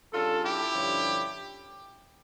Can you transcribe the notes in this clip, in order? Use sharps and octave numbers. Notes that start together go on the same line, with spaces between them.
C#3 G3 D4 F4 A4
E4 G4
G2 D3 F3 C#4